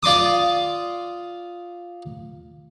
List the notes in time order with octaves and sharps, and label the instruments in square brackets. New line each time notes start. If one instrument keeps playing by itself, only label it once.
[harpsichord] F4 D5 C6 D6 D#6